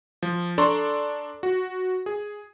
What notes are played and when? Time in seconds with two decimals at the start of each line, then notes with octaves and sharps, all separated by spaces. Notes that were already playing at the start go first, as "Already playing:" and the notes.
0.23 F3
0.58 D4 A4 D5 A#5 C6 C#6
1.43 F#4
2.06 G#4